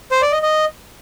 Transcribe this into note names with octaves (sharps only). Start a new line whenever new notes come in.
C5
D5
D#5
D#5